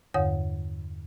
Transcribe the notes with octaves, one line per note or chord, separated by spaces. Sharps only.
E2 G2 D3 C#5 F#5 D#6